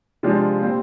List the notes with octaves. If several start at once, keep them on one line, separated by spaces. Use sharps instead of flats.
C3 F3 G#3 D4 F4
A#2 G3 C4